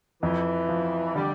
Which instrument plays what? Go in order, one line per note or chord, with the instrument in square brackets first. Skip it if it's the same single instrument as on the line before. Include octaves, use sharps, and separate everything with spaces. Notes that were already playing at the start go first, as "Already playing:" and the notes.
[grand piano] F2 [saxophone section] E3
[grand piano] F3
[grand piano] D3 [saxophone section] G3